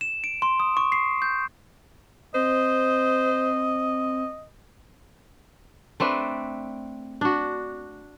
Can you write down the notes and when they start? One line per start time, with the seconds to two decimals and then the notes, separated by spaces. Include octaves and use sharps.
0.01 E7
0.24 D7
0.42 C6
0.60 D#6
0.77 C#6
0.92 C7
1.22 G6
2.35 C4 C5 D#5
6.00 A3 C4 D4 B4
7.21 D4 F#4